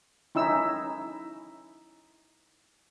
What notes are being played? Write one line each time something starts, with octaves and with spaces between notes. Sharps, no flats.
C#4 D#4 E4 E6